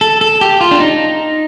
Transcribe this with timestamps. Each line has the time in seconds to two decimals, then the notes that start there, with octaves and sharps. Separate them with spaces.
0.01 A4
0.21 A4
0.41 G4
0.61 F4
0.71 D4
0.80 D#4